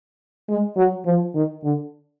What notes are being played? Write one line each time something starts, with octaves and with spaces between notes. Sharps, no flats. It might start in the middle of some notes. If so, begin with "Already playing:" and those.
G#3
F#3
F3
D#3
D3